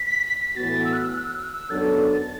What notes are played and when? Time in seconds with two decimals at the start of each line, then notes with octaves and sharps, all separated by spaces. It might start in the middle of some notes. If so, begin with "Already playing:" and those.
Already playing: B6
0.48 B6
0.56 A2 E3 B3 F#4 A6
0.85 E6
0.93 F#6
1.02 E6
1.11 F#6
1.19 E6
1.27 F#6
1.35 E6
1.44 F#6
1.52 E6
1.70 F#2 F#3 B3 D4 A4 A6